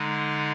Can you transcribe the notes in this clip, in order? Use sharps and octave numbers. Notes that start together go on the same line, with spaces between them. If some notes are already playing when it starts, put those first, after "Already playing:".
Already playing: D3 G#3 D#4